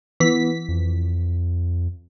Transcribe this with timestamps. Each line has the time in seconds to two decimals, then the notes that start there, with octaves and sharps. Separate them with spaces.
0.20 E3 B3 B6
0.69 F2